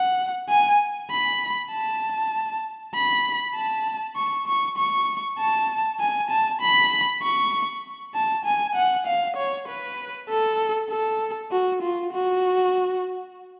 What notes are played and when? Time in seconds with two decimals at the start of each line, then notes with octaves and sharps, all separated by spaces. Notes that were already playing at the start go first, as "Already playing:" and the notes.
Already playing: F#5
0.49 G#5
1.11 B5
1.72 A5
2.95 B5
3.55 A5
4.16 C#6
4.47 C#6
4.78 C#6
5.39 A5
6.00 G#5
6.31 A5
6.61 B5
7.23 C#6
8.15 A5
8.45 G#5
8.76 F#5
9.07 F5
9.37 C#5
9.68 B4
10.29 A4
10.91 A4
11.51 F#4
11.82 F4
12.12 F#4